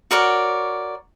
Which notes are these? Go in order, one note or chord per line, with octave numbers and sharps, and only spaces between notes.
F#4 A#4 C#5 D5